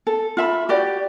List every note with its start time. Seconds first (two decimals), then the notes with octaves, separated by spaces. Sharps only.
0.07 A4
0.37 F4 E5 B5
0.69 F#4 G4 D5